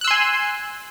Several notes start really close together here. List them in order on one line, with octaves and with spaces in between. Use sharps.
F#6 E6 C6 G#5